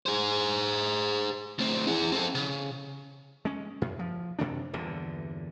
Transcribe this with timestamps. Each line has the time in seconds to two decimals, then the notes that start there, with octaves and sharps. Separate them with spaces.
0.06 G#4 C5
1.59 D2 C4
1.87 E4 G#4
2.12 C4 A4
2.35 C#3
3.45 G#3 C#4
3.82 F#2
3.99 F3
4.39 F#2 C3 D#3 D4
4.74 G1 E2 A#2 D3